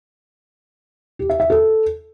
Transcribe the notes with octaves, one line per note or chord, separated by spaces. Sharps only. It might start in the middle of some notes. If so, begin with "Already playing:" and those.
G4
E5
E5
A4